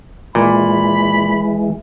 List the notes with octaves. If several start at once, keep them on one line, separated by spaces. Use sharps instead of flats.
A#2 E3 G#3 B5